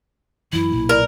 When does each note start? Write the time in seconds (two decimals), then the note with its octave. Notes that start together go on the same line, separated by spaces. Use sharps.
0.53 F#2 E3 E4
0.72 B1 A#2
0.89 A#4 D5